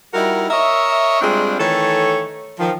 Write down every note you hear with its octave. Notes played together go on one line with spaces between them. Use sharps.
G3 D#4 E4 F#4 A#4
A#4 C#5 D#5 E5
G3 G#3 C4 D4 F4
D#3 E3 A3 A4 C#5
D#3 F3